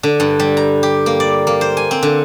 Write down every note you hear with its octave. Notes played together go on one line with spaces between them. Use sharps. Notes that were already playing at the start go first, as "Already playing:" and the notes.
D3
G2
G3
A#5
G4
A#3
D5
A#3
C5
G#5
C4
D3